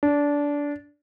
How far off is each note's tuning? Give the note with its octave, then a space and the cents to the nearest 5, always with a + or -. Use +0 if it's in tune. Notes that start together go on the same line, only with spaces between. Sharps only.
D4 -20